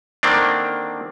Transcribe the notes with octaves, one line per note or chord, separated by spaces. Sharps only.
D3 D#3 A#3 C4 D4